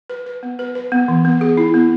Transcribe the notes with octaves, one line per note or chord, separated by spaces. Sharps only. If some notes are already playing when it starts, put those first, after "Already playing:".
B4
B4
B3
B4
B4
B3
E3
B3
G#4
E4
B3